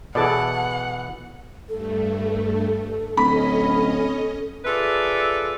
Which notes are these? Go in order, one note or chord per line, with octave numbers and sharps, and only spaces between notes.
B2 E3 G#4 A4 D5 F#5
G2 A3 A4
D1 C#4 D#5 B5
F4 G#4 A4 B4 D5 E5